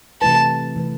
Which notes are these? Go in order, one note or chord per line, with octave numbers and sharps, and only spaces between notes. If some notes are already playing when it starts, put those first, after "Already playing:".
C3 E3 A3 E4 B4 A5
C3 E3 A3 E4 B4